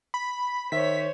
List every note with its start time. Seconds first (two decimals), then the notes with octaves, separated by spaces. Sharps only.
0.14 B5
0.72 D#3 C5 C#5 E5 B6